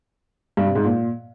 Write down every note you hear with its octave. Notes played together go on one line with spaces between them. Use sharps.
G2
C3
G#2
A#2